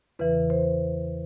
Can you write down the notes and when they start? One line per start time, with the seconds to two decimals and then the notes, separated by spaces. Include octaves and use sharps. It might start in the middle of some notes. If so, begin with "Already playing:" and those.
0.19 E2 C#3 E3 B4
0.50 C5